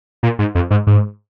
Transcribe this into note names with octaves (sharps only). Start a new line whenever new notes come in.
A#2
G#2
F2
G#2
G#2